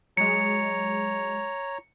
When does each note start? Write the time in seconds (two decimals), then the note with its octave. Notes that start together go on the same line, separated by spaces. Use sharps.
0.17 F#3 G#3 C#5 A#5 C#7